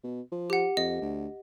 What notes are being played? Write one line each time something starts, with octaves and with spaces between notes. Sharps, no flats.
B2
F3
G4 F#5
F2 D#5
D2